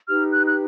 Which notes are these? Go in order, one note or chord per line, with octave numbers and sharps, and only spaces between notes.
D#4 G4 B4 F6
F#6
F#6